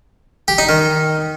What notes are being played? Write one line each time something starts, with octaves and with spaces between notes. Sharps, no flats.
G4
D#4
D#3